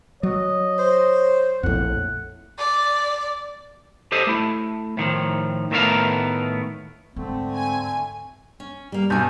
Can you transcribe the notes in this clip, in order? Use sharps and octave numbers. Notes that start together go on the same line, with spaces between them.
F#3 C#5 D#5
C5
A#1 F2 A2 F#5
D5
G4 A4 C5 D#5
A3 E4
A2 D#3 F3
A2 D#3 A3 B3 A#4 F5
D#2 G#2 D3 A3 C4
G#5
C#4
G3 A#3
B1 G2 F#4 G#5 G6